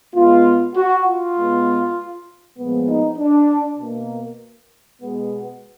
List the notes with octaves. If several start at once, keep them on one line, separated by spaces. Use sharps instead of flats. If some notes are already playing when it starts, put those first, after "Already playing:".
B2 G#3 B3 F4
F#4
F4
B2 G#3 B3
A#2 F3 G#3 B3
D#4
D4
B2 A#3
B2 G#3 B3